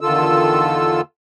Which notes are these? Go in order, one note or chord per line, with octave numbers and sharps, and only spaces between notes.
E2 D3 D#3 F4 A4 E6